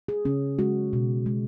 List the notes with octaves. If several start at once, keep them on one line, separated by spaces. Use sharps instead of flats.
G#4
C#3 C#4
G#3 F#4
B2
G#3